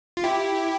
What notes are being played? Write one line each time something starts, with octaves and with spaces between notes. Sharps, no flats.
F4
E4 G4